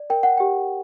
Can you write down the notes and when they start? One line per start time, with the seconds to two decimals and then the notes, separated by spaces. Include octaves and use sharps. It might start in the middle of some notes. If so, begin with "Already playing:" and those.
Already playing: D5
0.10 A#4 G5
0.23 F#5
0.38 G4 G5